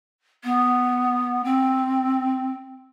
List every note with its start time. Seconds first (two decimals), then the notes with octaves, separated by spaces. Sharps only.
0.44 B3
1.44 C4